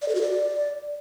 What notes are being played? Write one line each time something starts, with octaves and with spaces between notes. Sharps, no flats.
D5
A4
F#4
D5